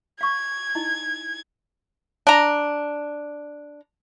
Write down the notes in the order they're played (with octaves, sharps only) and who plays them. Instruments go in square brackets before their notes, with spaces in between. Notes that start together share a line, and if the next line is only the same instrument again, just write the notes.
[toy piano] F5 C#6 [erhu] G#6
[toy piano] D#4 E4 D#5
[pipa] D4 A#5